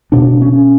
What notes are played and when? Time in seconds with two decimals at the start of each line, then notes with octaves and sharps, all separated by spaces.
0.12 B2 D4
0.42 C#4